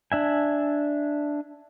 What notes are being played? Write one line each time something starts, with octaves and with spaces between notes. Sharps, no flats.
D4 E5 G#5